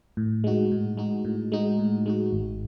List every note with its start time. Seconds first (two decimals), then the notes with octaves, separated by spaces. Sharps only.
0.17 A2
0.44 G#3 D#4 F#4
0.71 A2
0.97 G#3 D#4 F#4
1.25 A2
1.52 G#3 D#4 F#4
1.79 A2
2.06 G#3 D#4 F#4
2.33 G#1